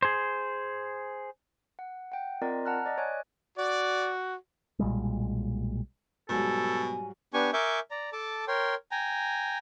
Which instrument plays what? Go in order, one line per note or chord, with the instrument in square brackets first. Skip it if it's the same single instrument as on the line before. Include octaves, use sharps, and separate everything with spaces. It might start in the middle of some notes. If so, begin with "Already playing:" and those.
[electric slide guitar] G#4 C5
[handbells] F#5
F#5 G5
C4 F4 A#4 D5 D#5 A#5
F#5 A5 A#5 F6 F#6
D5 D#5
C#5 D#5 G#5 F#6
[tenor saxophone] F#4 [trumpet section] D5
[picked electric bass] B1 A#2 G3 G#3
[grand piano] G#2 F#3 G3 [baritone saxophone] B2 [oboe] A4 [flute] G#5
[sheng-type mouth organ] B3 D4 G4 G#5 C#6
A#4 E5 G#5 C#6 D6 G6
D5 A#5
A4 A5 D6
A#4 C#5 G5 C6
G5 G#5 A#5